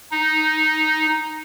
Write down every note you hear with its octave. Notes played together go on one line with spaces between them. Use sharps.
D#4